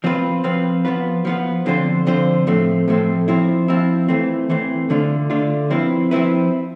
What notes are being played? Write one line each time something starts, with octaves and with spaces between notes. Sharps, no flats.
F3 C4 F4 B4
F3 C4 F4 B4
F3 B3 F4 B4
F3 B3 F4 B4
D3 F3 C4 F4 C5
D3 F3 C4 F4 C5
A2 F3 A3 C4
A2 F3 A3 C4
F3 C4 E4
F3 C4 E4
E3 A3 C4
E3 A3 C4
D3 A3 D4 F4
D3 A3 D4 F4
F3 C4 E4 B4
F3 C4 E4 B4